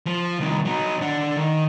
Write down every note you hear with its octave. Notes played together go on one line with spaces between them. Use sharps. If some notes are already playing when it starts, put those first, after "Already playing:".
F3
C2 D#3
F#3 D#4
D4 F#5
D#3